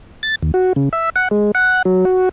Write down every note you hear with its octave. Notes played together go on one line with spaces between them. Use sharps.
A6
D#2
F#4
C#3
E5
F#5
G#3
F#5
F#3
F#4